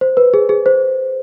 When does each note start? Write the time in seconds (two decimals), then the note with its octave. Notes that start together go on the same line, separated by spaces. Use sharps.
0.01 C5
0.17 B4
0.34 G#4
0.49 G#4
0.66 C5